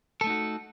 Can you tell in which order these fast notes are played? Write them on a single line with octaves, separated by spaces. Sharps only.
A4 A3 D#4 F#4